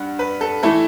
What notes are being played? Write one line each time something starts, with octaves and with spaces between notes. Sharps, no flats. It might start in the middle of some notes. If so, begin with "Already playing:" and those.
Already playing: G2 F#5
B4
A4
E3 A3 E4 A4